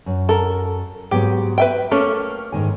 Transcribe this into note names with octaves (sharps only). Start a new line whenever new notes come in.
F#2
A4 A#4
G#2 F#3 B3 G4
B4 E5 G5
A3 A#3 C#4 A4
G#2 D#3 G#5